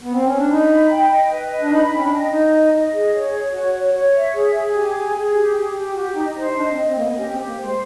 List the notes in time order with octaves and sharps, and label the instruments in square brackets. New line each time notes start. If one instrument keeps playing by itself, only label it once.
[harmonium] B3
C4
C#4
D4
[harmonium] D#4 [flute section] B5
[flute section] B5
G5
D#5
B4
D#5
[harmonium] D4
[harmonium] D#4 [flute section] B5
[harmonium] C#4 [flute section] G5
[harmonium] D4
[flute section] D#5
[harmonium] D#4 [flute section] D#5
[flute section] D#5
D#5
G#4
C#5
C#5
[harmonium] F#4 [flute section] C#5
[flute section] C#5
C#5
E5
G#4
G#4
[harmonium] G4 [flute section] G#5
[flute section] G#4
G#4
G4
G4
G4
[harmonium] F#4 [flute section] G4
[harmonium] D#4 [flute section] D#5
[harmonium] D#4 [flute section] C5
[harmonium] D4 [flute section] D#5
[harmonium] C4
[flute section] D#5
[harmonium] C4
[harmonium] A#3 [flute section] D#5
[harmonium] B3
[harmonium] C#4 [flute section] G4
[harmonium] C4
[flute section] G4
[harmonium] A#3
[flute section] C5
[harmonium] G#3